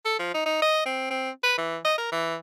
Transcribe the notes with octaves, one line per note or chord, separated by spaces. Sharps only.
A4
F3
D#4
D#4
D#5
C4
C4
B4
E3
D#5
A#4
E3